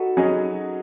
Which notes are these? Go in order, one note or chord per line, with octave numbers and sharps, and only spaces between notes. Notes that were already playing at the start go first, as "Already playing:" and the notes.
Already playing: D#4 F#4 A4 B4
F#3 C#4 G#4 D#5